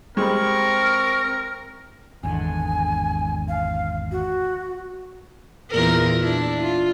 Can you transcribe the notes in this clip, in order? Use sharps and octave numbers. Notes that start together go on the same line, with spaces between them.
G3 G#3 C4 A#4 C#6
G#1 E2 D3 G#5
F5
F#4
E2 A#2 A#4
D4 E4
F4